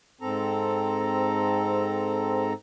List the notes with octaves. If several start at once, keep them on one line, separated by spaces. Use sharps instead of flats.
G#2 C4 A4 A#5